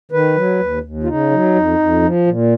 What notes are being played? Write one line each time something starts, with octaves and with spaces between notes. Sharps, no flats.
D#3 B4
F#3
D#2
D#2
F4
C#3 D#4
F#3
F2
F2
F3
A#2